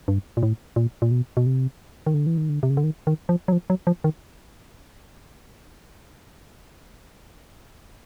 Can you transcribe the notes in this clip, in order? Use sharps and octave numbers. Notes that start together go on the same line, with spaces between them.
G2
A#2
A2
A#2
A#2
B2
B2
C3
D#3
D3
E3
D#3
D3
C3
C#3
D3
D#3
D#3
F3
F#3
F3
F#3
F3
D#3